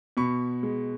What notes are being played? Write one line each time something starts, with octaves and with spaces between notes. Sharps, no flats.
B2 B5 C#6
G#3